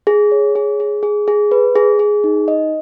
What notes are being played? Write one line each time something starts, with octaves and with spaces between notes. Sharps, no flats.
G#4
C#5
G#4
G#4
G#4
G#4
B4
G#4
G#4
D#4
D#5